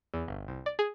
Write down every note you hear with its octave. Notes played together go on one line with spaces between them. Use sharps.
E2
G1
C2
D5
G#4